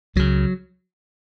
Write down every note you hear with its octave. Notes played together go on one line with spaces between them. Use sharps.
C#2 C#3 F#3